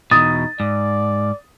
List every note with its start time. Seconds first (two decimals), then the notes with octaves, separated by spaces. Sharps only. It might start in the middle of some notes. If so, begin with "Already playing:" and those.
0.11 E2 B2 D#4 D#6 A6
0.60 G#2 D5